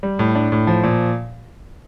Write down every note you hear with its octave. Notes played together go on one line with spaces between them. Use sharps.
G3
A2
D4
A2
F3
A#2